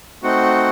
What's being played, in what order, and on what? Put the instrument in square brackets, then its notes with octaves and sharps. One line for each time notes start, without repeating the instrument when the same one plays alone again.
[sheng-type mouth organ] A3 C4 D#4 F#4 F#5